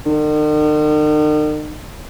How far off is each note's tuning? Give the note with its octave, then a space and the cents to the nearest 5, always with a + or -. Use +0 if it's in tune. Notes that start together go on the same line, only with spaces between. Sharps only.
D#3 -45